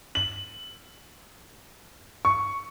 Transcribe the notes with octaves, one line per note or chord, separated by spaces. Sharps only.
F#7
C#6